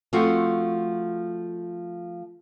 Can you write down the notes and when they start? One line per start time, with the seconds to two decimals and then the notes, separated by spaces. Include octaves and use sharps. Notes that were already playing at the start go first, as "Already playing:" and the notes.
0.13 F3 A3 C4 F#4